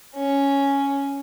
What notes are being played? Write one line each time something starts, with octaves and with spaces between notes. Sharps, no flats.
C#4